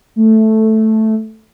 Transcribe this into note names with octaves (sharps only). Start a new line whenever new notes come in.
A3